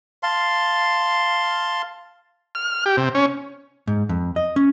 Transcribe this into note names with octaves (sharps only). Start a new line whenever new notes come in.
F5 A5 C6
F6
G4
C3
C#4
G#2
F2
D#5
C#4